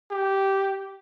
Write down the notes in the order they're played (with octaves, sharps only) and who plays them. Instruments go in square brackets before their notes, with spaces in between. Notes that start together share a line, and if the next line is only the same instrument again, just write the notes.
[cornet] G4